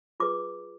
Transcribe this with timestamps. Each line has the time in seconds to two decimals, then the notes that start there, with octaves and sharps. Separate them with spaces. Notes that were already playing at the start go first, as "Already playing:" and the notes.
0.20 F4 G#4 B4 D6